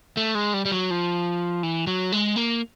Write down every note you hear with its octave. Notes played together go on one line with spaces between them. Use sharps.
A3
G#3
G3
G3
F#3
F3
E3
F#3
G#3
A#3